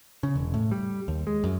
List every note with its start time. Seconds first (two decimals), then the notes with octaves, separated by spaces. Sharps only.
0.23 C#3
0.36 E1
0.54 A2
0.71 G3
1.08 D#2
1.27 G#3
1.44 F#2